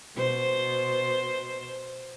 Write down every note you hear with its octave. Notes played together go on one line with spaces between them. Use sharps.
B2 C5